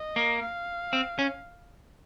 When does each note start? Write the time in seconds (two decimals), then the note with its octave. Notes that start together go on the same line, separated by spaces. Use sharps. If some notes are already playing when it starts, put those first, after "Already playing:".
Already playing: D#5
0.16 A#3
0.41 F5
0.93 C4
1.19 C#4